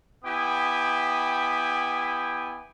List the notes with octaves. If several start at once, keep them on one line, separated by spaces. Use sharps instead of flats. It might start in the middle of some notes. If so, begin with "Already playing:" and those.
B3 E4 G4 G5 G#5 D#6